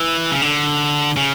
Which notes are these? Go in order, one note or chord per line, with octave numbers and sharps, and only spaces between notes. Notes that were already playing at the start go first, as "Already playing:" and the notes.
Already playing: E3
C#3
D3
C#3